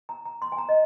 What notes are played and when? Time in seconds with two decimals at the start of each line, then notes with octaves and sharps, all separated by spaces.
0.09 A#5
0.25 A#5
0.42 C6
0.52 G#5
0.58 A#5
0.69 D#5